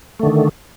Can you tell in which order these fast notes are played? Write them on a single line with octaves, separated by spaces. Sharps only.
A3 D3 D#3